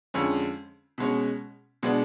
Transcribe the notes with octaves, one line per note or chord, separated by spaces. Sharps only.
F2 D3 G#3 C#4
B2 G#3 C#4
B2 G#3 B3 D4